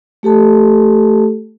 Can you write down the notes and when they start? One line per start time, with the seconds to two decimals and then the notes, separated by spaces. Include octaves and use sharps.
0.23 A3 G4 A4 A5